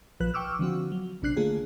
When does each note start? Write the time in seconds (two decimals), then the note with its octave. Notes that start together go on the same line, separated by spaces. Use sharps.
0.20 A#1 F3 B4 F#6
0.34 G5 C#6 D6 E6 F6
0.59 D3 F3 C4 F#4
0.92 F#3
1.22 A#1 C3 D4 F#6 C7
1.36 D3 A3 A#3 F4 G#4